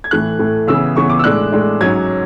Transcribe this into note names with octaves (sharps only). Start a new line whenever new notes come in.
G#6
A2 E3 A3 F#6
A2 E3 A3
C#3 E3 B3 E6
C#3 E3 B3 C#6
D6
E6
A2 G#3 D4 F#6
A2 G#3 D4
G#2 F#3 C#4 G#6